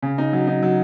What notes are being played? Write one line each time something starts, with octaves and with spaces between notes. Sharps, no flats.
C#3
D#4
F#3
D#4
F#3